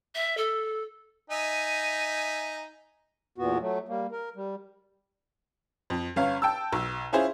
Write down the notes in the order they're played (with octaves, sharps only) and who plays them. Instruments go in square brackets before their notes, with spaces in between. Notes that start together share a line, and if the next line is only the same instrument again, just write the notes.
[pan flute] E5
A4
[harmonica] D#4 E5 G#5
[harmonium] E2 A#2 B3 F#4
F#3 A3
G3 A#3
A#4
G3
[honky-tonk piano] F2
G1 C#4 F5
G5 A5 E6
B1
C#4 E4 F4 G#4 C5